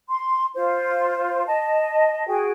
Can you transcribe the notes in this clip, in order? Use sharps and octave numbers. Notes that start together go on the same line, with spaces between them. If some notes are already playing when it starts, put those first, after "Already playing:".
C6
F4 C5
D#5 A5
F#4 G#4 G5